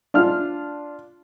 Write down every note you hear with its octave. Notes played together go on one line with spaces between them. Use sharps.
D4 F4 F6